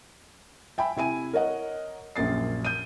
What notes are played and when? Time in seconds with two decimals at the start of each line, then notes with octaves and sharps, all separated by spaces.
0.78 E5 G5 G#5 B5
0.96 C3 E4 G#5 D#7
1.33 A#4 C#5 D#5 F#5
2.16 A#1 F#2 A#2 A6 C7
2.65 G6 D#7